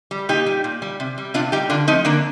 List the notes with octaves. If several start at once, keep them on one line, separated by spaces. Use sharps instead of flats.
G3
A#2 D#4 G4
G3
A#2
G3
C3
G3
C3 D4 F4
G3 D#4 G4
D3 D4 F4
F3 A3 C4 D#4
D3 A#3 D4